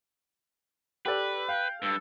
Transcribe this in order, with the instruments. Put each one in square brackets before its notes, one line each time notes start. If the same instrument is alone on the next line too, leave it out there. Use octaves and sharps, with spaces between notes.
[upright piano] G4 A4 D5 [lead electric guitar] B4
[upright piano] F5 [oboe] G5
[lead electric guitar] G2 [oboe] A4